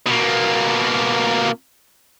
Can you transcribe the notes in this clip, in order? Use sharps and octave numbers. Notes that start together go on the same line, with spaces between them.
B2 A#3